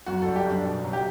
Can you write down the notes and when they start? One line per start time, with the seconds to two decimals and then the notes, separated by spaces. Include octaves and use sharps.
0.06 F#2 F#4
0.22 G3 A4
0.36 G4
0.46 F#2 D4
0.64 B2
0.84 F#3
0.93 G4